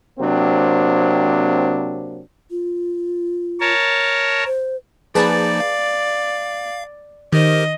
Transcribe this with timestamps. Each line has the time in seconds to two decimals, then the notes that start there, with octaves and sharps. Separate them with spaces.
0.19 C3 F#3 A#3 C4 D4
2.51 F4
3.60 A#4 C#5 A5
4.46 C5
5.15 F3 A#3 D#4 G#4 B4 D5 A5
5.60 F5
7.33 D#3 G4 A#4 C5 D#5